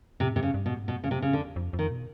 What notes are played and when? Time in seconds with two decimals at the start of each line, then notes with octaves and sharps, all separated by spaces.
0.20 A2 C3
0.36 G2 C3
0.43 C#3
0.54 G2
0.66 B2
0.71 G#2
0.88 G2 B2
1.04 G#2 C#3
1.11 C3
1.22 A2 C#3
1.33 D3
1.39 E2
1.56 F2
1.73 F2
1.79 D#3
1.91 B2